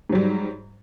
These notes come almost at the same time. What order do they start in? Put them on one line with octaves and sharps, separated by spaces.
G#2 F#3 G3